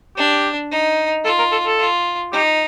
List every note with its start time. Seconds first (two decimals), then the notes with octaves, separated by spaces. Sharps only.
0.17 D4 G4
0.71 D#4
1.25 F4 A4
1.38 A#4
1.51 A4
1.66 A4
1.79 F4
2.32 D#4 G4